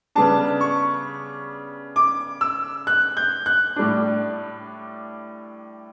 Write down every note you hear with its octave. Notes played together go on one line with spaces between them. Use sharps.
C#3 G3 B3 D4 A5
C#6
D6
E6
F#6
G6
F#6
A2 G3 D4